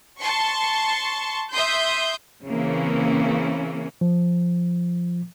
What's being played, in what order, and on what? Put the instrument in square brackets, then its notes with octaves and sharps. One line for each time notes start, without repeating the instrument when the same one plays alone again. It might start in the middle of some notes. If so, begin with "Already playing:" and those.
[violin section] A5 C6 C#6
E5 C6 D#6 G6
[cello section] C#3 E3 A#3 C4 C#4
[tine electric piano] F3